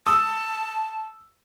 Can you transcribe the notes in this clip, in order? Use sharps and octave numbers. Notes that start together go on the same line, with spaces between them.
A5 D#6 E6